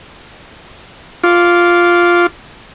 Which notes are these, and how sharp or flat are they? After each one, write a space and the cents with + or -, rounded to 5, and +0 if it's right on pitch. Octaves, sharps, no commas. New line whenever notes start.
F4 +0 D6 -20